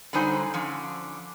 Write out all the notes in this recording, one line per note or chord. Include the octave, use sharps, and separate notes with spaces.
D3 F#3 G3 D#4 C5 G#5
D3 F3 C#4